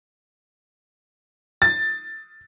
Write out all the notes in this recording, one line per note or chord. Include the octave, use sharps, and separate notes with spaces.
A6